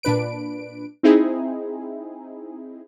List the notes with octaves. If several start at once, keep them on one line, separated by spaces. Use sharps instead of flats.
A#2 D4 B4 D7
C4 D#4 E4 G#4